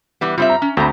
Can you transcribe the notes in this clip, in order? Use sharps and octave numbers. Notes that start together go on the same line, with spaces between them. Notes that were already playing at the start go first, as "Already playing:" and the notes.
E3 G3 B3
G3 C4 F4 E5
A#5
C#4
D2 A3 C4 A#5 B5